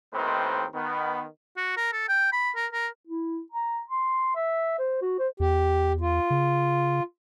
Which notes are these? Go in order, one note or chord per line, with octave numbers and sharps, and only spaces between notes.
D#2 A2 D#3 C4 B4 C5
D#3 B3
F#4
A#4
A4
G5
B5
A#4
A#4
E4
A#5
C6
E5
C5
F#4
C5
E2 G4
F4
C#3